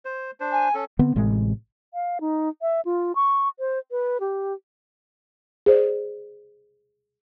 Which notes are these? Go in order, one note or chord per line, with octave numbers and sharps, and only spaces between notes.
C5
D4 C5
G#5
C#4 A4
D3 B3 C4
A1 A2 C3 G#3
F5
D#4
E5
F4
C#6
C5
B4
G4
G#4 C5 D5